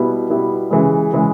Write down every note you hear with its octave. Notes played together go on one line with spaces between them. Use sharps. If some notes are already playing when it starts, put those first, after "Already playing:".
Already playing: B2 G3 B3 E4
B2 G3 B3 E4
C#3 E3 G#3
C#3 E3 G#3